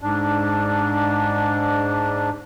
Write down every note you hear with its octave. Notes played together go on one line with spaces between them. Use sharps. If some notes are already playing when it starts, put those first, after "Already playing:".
G#2 D4